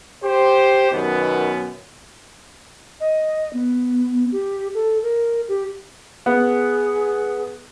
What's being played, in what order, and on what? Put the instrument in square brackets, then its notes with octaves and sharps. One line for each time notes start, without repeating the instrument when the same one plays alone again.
[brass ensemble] G4 C5
F#2 B2 D#3 B3
[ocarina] D#5
B3
G4
A4
A#4
G4
[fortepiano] B3 [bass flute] G#4